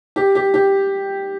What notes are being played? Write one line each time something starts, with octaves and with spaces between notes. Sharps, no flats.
G4
G4
G4